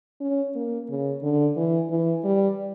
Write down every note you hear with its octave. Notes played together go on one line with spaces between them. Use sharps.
C#4
A#3
C#3
D3
E3
E3
G3